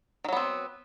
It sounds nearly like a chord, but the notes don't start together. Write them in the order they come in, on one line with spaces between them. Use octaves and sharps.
D#3 F#3 B3 C4